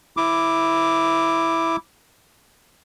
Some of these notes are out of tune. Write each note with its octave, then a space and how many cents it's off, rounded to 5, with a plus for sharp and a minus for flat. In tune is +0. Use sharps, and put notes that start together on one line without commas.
E4 +0 D6 +0